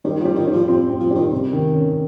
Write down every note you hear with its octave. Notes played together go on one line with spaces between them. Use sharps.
D#3 G3
F3 G3
D#3
G3
F3
F3 C4
C4
F3
D#3 G3
C3
D#3
C#4